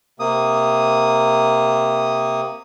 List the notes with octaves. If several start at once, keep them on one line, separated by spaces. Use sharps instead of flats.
C3 A#3 D#6